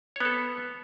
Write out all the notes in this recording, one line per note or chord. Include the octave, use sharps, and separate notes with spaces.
B3 A4 C#5